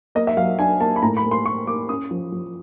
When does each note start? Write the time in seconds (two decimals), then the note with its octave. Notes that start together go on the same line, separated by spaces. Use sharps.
0.15 A#3 D#5
0.27 E5
0.37 F#3 F5
0.59 D4 G#5
0.80 A#3 A5
0.96 B5
1.02 A2 A#5
1.17 B5
1.24 A#3
1.31 C6
1.45 A#3 C#6
1.67 A#3 D6
1.89 C#4 D#6
2.11 F3
2.32 F3